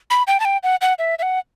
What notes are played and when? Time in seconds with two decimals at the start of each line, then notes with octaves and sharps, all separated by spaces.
0.10 B5
0.27 G5
0.40 A5
0.45 G5
0.63 F#5
0.81 F#5
0.99 E5
1.19 E5
1.22 F#5